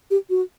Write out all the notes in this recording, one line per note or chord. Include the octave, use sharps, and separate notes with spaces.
G4
F#4